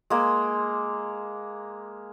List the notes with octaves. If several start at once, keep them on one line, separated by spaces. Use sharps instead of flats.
G#3 A#3